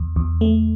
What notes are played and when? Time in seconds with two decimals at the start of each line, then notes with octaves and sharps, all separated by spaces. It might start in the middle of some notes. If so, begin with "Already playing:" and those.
Already playing: E2
0.16 E2
0.41 A3